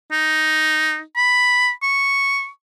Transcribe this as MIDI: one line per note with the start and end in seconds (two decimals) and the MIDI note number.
0.12 1.01 63
1.16 1.70 83
1.83 2.48 85